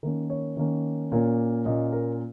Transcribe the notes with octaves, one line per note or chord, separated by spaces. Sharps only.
D#3 A#3 C#4 A#4
C#5
D#3 A#3 C#4
A#2 A#3 C#4
A#2 A#3 C#4 D#5
A#4